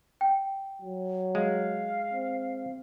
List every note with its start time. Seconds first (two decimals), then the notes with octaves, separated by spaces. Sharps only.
0.21 G5
0.82 F#3
1.35 G#3 F5
2.13 C4